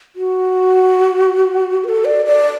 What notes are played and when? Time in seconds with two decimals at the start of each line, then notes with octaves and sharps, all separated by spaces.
0.16 F#4
1.84 B4
1.89 A4
2.05 D5
2.25 D5